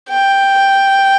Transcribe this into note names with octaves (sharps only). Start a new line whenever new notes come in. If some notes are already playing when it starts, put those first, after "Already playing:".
G5